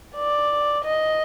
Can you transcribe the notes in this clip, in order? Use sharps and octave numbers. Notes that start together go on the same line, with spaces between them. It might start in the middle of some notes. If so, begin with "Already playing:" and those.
D5
D#5